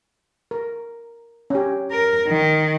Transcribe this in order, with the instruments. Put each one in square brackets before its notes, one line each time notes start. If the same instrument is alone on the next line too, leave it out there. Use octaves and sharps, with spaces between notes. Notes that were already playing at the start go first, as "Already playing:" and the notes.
[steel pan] A#4
C#4 G4
[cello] A#4
D#3